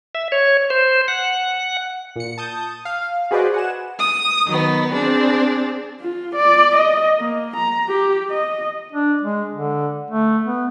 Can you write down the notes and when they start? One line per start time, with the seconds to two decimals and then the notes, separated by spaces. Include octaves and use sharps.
0.15 E5
0.32 C#5
0.70 C5
1.08 F#5
2.16 A#2 C#7
2.38 A5 D#6 G6
2.85 F5
3.31 F#4 G#4 B4 C5 D5 D#5
3.54 F#5 G#5 E7
3.98 D#6
4.47 D#3 F#3 B3
4.93 C4 D4 G#4
6.01 F4
6.35 D5
6.75 D#5
7.18 A#3
7.56 A#5
7.89 G4
8.30 D#5
8.92 D4
9.22 G#3
9.53 D3
10.11 A3
10.45 B3